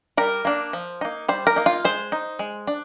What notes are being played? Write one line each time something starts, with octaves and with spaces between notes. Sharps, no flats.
G3 A#4
A#3 D4
F3
A#3 D#4
G3 C5
A#4
A#3 D#4
F4
G#3 C5
D#4
G#3
D4